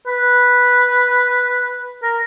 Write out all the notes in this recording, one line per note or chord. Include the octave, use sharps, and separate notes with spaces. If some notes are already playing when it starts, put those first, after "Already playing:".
B4
A#4